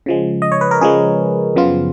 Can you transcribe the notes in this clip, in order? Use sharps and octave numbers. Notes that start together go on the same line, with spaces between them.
C#3 F3 G#3
D#5
C#5
B4
A#4
C#3 F3 G#3 G#4
F#2 C#3 F3 B3 F4